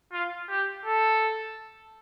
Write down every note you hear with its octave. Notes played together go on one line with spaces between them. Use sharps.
F4
G4
A4